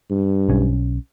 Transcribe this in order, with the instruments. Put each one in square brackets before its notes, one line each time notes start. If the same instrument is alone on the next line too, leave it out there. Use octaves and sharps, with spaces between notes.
[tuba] G2
[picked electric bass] B1 C#4